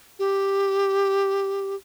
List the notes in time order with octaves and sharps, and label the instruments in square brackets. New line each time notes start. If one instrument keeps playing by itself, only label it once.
[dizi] G4